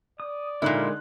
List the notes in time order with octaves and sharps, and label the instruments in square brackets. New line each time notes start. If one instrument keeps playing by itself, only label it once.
[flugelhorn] D5 [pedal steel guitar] D#6
[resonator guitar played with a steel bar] A#2 E4 [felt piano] D3 D#4 F#6 [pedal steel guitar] G#3 A#4 C6